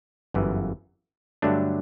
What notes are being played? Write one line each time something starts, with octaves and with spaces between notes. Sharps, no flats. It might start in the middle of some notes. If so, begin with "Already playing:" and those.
G1 F#2 E3
G2 D3 F#3 A3 D4